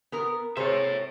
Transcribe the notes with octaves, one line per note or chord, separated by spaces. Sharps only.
B3 A#4
C3 G#4 C5 C#5 E5